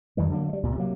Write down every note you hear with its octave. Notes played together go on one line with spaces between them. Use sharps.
F2 D#3 E3 G3
D3 F#3 G#3 A#3
G3 G#3
C#2 A#2
C3 F#3 A#3